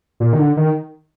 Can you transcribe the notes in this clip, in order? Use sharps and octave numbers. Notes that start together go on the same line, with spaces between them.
A#2
D#3
D3
D#3